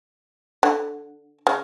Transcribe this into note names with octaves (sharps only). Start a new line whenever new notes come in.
D3
C#3